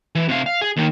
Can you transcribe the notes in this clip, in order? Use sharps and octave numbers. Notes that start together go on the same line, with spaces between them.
E3
C3 F5
F5
G#4
D#2 D#3